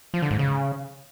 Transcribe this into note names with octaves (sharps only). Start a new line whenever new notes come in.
F3
D3
G#2
C#3